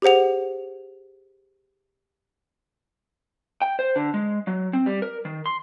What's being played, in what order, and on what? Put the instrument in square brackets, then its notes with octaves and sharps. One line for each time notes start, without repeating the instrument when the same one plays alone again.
[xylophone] G4 G#4 C5 F#5 F7
[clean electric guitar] G5
C5
D3
G#3
F#3
C4
G3
A#4
D#3
C6